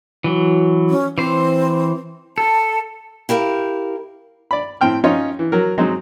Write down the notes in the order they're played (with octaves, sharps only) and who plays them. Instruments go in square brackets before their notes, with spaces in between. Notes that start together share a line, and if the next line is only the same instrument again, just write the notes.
[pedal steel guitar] E3 F#3
[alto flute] C#4
[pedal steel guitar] E3 C5 [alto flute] C4
[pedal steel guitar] A4 [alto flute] A5
[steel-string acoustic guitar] E4 G4 A#4 F5
[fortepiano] D5 B5
A2 C4 G5 F6
C#4 D#4 F4 C#5 C6
E3
F#3 A#4
F#3 G#3 C4 D#4